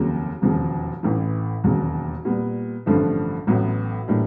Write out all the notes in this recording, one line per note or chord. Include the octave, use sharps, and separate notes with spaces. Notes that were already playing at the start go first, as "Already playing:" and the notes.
Already playing: F1 D#2 C#3 F#3 A#3
E1 D#2 C#3 F3
A1 A2 E3
E1 D#2 C#3 F#3 A#3
A#2 G3 B3
A1 G2 D3 F3 A3
A1 A2 F#3 B3
A2 E3 G3 A#3 D4